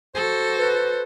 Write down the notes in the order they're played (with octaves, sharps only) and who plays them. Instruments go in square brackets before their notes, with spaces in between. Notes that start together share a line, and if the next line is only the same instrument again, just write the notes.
[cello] F#4 A4 [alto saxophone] C5
[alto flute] B4